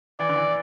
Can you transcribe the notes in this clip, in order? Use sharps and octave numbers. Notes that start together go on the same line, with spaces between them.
E3 D5
D3
E3